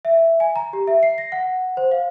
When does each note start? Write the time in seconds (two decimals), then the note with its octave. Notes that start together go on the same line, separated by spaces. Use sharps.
0.05 E5
0.40 G#5
0.56 A#5
0.73 G4
0.88 E5
1.03 C7
1.18 A#6
1.32 F#5
1.77 C5
1.91 F5